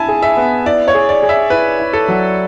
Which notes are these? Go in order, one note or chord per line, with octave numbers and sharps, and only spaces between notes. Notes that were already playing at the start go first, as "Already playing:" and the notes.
Already playing: E4 G#5 A5 B5
G#4
E5
B3
E4 D5
C#5
G#4
D5
G#4
E5
E4 B4
E4
A4
F#3